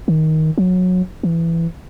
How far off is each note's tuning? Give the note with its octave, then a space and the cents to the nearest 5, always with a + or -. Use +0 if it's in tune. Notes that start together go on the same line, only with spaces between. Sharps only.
D#3 +15
F#3 -20
E3 +15